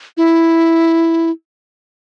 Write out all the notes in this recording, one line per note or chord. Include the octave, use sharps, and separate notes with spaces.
E4